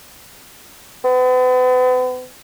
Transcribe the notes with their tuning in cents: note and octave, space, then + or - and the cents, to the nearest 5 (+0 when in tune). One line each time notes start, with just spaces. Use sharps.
B3 +40